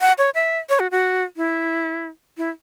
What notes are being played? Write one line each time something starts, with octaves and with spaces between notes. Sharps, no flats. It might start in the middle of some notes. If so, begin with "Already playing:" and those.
F#5
C#5
E5
C#5
F#4
F#4
E4
E4